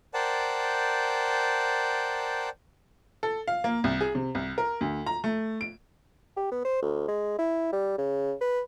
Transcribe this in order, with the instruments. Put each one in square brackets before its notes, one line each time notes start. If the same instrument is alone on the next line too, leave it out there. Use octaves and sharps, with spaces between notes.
[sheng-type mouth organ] A#4 C5 D5 F#5 G5 A5
[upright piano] A4
F5
A#3
C2
G#4
C3
C2
A#4
D2
A#5
A3
D7
[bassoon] G4
B3
C5
D2
G#3
E4
G3
C#3
B4